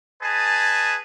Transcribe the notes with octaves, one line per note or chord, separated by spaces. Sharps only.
G#4 B4 D#5 G#5 A5